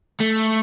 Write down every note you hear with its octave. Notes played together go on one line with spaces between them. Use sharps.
A3